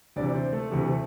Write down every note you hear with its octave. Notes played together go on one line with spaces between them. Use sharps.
D2 C3 E3 D4 D5
C4 C5
A3 A4
D2 C3 E3